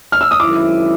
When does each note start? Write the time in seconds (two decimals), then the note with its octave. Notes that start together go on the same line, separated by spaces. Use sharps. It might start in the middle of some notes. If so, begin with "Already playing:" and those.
0.12 F6
0.21 E6
0.31 D#6
0.40 F#2 D#3 G#3 C4 E4 D6